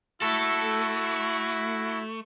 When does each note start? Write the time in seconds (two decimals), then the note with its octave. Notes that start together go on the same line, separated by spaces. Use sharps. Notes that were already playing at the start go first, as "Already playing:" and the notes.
0.22 A3 E4 F#4 A4